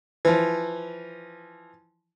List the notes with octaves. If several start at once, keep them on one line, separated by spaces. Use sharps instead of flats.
E3 F3